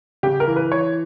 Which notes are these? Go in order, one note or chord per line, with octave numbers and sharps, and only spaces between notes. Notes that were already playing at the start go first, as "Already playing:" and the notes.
C#3 G4
A#4
E3
B4
E3 C#5